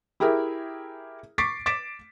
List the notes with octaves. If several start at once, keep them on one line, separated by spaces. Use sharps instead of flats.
E4 G4 G#4 A#4 E5
C#6 D6 A6 B6 C7 D7
D6 A6 B6 D7 E7